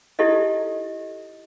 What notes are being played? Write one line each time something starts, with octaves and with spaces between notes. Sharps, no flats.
D#4 E4 G4 A4 D#5